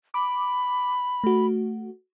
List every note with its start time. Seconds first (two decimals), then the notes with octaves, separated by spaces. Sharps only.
0.14 B5 D6
1.24 A3 F#4